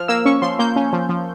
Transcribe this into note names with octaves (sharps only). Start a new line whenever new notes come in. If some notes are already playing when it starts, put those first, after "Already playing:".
Already playing: F3 F6
A#3 E6
C#4 C#6
F3 C6
A#3 G6
C#4
F3
F3